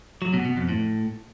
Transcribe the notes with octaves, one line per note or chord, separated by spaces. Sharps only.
F#3
B2
B2
F2
A2